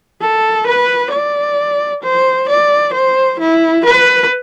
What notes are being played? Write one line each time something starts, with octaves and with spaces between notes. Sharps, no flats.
A4
B4
D5
C5
D5
C5
E4
B4